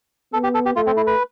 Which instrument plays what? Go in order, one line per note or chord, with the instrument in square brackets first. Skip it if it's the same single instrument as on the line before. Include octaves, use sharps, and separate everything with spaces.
[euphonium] B3 [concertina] A4
[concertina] G4
A4
G4
[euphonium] A3 [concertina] F4
[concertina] C4
E4
B4